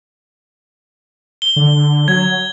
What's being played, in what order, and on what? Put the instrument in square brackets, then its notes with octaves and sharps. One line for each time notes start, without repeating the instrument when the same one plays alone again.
[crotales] G7
[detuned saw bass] D3
[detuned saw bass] F#3 [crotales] G#6